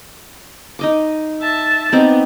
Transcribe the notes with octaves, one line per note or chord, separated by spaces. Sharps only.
D#4 D#5 D6
E5 A5
B3 C4 D#4 D6